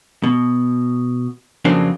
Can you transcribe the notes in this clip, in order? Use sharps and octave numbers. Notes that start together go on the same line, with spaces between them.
B2
F2 C#3 F#3 A#3 C4 D4